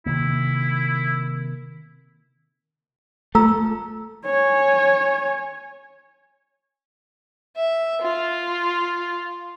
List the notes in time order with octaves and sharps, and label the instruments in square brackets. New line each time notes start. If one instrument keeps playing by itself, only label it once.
[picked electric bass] C3 D#3 A#3 [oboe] E4
[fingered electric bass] A3 [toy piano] F4 A#5 E6
[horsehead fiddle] C#5 G#5
[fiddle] E5
F4